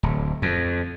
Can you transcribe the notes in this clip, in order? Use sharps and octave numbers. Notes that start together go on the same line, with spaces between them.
D1
F2